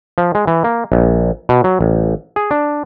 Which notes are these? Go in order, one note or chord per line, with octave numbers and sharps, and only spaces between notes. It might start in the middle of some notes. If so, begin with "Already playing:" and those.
F3
G#3
E3
A#3
A#1
B2
F#3
A1
G#4
D4